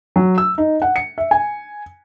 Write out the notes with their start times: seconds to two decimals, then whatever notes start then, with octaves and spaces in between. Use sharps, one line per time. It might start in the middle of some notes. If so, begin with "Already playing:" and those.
0.16 F#3
0.38 E6
0.58 D#4
0.82 F#5
0.96 C#7
1.18 E5
1.31 G#5